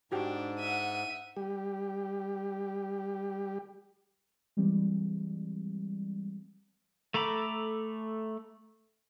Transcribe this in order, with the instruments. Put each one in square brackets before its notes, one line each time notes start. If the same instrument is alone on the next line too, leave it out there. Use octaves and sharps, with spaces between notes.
[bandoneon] G#2 [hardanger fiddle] D4 [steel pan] F#4 G4 G5
[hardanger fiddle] E5 F#5 [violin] D#7
[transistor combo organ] G3 G4
[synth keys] E3 G3 G#3 C4
[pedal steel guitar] A3 A4 A#5 B5 D6